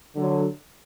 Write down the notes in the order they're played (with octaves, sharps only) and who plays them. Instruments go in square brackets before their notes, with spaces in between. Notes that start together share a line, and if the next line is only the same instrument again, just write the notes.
[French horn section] D3 F#3